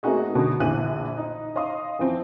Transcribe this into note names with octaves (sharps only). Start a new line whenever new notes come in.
A3 A#3 C4 D#4 F#4 G#4
B2 D3
A#1 D3 E3 F#6 D#7
D#4
D#5 F5 C6 D#6
E3 F3 C4